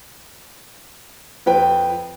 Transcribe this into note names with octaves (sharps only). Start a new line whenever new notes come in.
F2 B4 G5